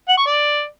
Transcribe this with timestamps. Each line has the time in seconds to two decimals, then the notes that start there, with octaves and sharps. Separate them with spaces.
0.09 F#5
0.17 C#6
0.26 D5